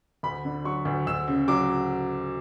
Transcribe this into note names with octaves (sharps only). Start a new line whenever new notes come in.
D2 B5
D3
F#3 C#6
D2
D2 E6
C#3
F#3 D6